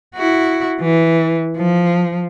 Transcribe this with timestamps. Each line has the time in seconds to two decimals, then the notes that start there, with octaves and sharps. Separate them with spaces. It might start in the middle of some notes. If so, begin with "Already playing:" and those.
0.15 E4 F#4
0.81 E3
1.57 F3